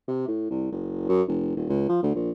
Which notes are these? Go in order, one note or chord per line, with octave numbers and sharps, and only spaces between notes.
C3
A2
C2
F#1
F#2
F1
D#1
C#2
F3
D2
A#1